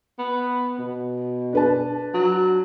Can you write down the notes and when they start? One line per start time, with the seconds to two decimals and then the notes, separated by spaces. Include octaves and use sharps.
0.19 B3
0.79 B2
1.53 D4 B4 A5
2.14 F#3